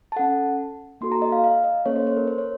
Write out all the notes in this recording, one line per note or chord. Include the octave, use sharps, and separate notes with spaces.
A5
C#4 A4 F#5
A#3 D#4 F#4 A4 C6
A#5
D#5
F5
F5
D#5
A#3 C#4 A4 C#5
C5
C5
A#4
C5
C#5